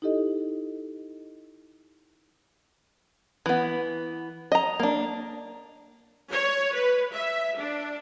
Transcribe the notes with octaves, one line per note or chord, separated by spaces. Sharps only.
D#4 E4 G4 A4 D#5
E3 B3
D#5 A#5
A#3 D4
C#5
B4
E5
D4